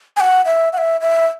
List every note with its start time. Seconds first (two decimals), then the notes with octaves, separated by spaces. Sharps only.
0.17 G#5
0.20 F#5
0.45 E5
0.73 F#5
0.78 E5
1.01 E5